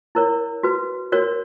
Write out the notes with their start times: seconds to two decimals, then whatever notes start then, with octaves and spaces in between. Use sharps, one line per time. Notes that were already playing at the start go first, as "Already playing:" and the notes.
0.15 E4 A#4 C#5
0.63 F#4 B4
1.12 F#4 A#4 C#5